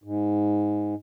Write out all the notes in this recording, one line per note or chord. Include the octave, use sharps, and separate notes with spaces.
G#2